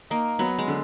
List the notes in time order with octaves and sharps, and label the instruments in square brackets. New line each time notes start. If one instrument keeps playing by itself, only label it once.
[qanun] A#3 [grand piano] D#4
[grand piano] F#3 [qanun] B3
[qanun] G#3
[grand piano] D3